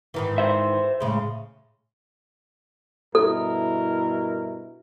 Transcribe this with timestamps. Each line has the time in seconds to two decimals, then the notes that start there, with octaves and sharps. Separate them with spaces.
0.14 G#2 D#3 E3
0.38 C5 E5
1.00 A2 C#3 G#3
3.15 G2 B2 E4 A4 A#4